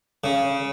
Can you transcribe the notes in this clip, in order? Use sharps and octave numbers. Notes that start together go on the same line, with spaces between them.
C#3